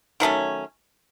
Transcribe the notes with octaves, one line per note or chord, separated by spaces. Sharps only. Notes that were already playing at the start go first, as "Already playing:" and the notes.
D#3 F#3 A3 C#4